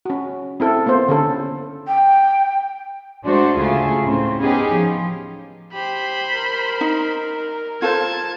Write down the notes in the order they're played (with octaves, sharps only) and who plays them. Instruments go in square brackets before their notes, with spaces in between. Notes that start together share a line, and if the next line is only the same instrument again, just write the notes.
[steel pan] C#4 F#4
C4 E4 A4
A#3 B3 F4 C5
D3 C#4 A4
[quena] G5
[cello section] G#3 A3 D4 F#4 C5 D5
D2 C#3 A3 F4 G#4
A2 C#3 C4
B3 C#4 D#4 G4 G#4
F3
[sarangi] G4 [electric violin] C5 B5
[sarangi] A#4
[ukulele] D#4
[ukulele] F4 A4 C5 [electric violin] A5 G#6